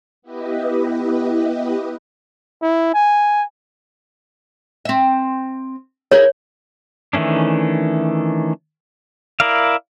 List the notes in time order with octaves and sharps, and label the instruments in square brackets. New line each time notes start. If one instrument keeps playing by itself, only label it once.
[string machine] B3 E4 G4 B4 D#5
[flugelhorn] E4
G#5
[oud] C4 E5
[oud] E4 G#4 A#4 [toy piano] C#5
[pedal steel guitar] D#3 E3 A3 C#4 D4
E4 A#4 D5 F5